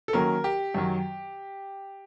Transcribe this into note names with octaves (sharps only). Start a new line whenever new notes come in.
A4
D#3 F#3 A#3 C#4 A#4
G4
F#2 D#3 F#3